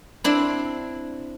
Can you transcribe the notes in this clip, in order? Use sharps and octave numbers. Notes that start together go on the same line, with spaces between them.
C4 D4 E4